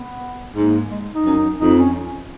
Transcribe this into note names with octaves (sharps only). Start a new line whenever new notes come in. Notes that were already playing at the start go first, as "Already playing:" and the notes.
Already playing: B3
G#2 A#3
G#3
D#4
F#2
F2 D#4
C#4